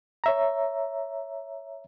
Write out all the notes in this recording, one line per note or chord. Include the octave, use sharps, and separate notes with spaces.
C#5 E5 A#5